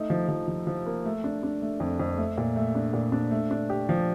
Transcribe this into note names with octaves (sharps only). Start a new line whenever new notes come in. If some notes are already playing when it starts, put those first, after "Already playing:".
Already playing: A3 D#4
F3
F3
F3
F3
A#3
A3
D4
D4
A3
F2
F2
A3
A#2
A3
D4
A#2
D4
A3
D4
G4
F3